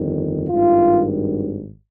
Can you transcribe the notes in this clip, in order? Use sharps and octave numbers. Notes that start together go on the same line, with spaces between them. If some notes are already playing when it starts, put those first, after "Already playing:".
Already playing: G1 F2 D#3
G#1 G2 D#3 F4